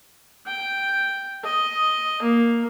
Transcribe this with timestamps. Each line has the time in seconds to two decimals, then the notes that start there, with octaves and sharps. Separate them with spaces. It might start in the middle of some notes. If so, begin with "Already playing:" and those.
0.47 G5
1.43 D#5
2.22 A#3